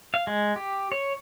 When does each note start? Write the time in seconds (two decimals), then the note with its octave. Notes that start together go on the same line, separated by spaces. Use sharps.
0.14 F5
0.27 G#3
0.56 G4
0.92 C#5